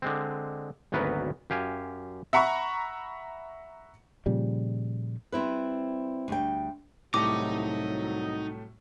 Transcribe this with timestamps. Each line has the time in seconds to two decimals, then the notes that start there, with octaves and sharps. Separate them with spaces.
0.02 D3 G#3 C4
0.92 G#1 D2 F#3 B3 A#4 B4
1.50 F#2 G4 F5 G#5
2.33 E5 F#5 A#5 B5 C#6
4.26 A#2 C#3 F3 G3
5.32 G3 C4 E4 B4
6.28 D2 G3 G5
7.14 C2 A2 F#3 G3 A3 D#4 A#5 D6